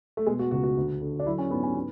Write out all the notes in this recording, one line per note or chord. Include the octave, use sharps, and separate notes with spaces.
A3
B2 G#3
F#4
C#2 F#4
F#4
D2
D3
D4
F#3 E4
C#4
G#2 B3
C#4
B3